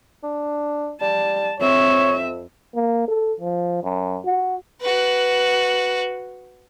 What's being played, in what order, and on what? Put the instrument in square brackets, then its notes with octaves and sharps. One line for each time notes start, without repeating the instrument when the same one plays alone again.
[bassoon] D4
[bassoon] G3 [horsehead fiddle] A5
[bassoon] F2 [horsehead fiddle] C4 E5 [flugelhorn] C#5
[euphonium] A#3
A4
F3
F#2
F#4
[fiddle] F#4 B4